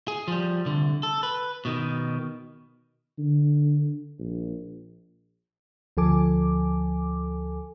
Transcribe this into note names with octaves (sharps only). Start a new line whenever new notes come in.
G#4
F3 G3
C2 D3
A4
B4
B2 D#3
D3
A#1
D2 F3 A4 G#5 D6